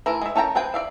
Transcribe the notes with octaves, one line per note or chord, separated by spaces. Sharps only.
E3 A3 E4 A#4
G#3 E5
C#4 A4 A#4 G5 A#5
C4 G#4 B4 G5
D5 E5 F5